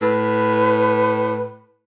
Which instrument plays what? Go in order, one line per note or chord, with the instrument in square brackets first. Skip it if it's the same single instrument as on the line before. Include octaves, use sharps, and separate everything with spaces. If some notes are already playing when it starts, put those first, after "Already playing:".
[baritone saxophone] A2 [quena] B4